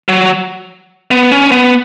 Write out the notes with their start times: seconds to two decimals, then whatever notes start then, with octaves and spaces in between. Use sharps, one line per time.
0.09 F#3
1.11 B3
1.31 C#4
1.52 B3